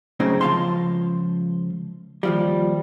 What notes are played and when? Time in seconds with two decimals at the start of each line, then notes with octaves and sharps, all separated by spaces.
0.20 F#2 A2 C#3 C4 D#4
0.41 C#2 F3 G#3 F5 A5 C6
2.23 D#2 F3 G3